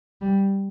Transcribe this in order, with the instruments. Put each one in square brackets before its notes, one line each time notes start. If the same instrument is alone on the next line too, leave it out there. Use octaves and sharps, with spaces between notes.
[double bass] G3